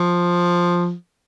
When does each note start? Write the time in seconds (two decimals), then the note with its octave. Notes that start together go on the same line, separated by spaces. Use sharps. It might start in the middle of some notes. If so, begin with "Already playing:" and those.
Already playing: F3